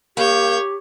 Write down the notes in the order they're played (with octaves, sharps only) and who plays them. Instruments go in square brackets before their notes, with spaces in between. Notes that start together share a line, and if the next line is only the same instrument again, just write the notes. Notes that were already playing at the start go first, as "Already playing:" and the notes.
[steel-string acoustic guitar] G2 A#3 [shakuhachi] G4 [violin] C#5 G6